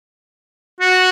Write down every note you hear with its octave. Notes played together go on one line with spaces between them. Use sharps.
F#4